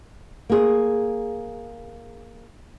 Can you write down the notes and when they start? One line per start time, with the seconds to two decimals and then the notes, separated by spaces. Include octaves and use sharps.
0.50 A#3 G#4